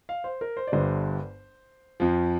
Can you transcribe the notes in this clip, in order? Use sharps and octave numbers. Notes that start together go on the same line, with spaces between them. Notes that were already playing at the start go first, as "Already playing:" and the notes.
F5
C5
A#4
C5
D5
G1 G2 D3 G3 C5
F2 F3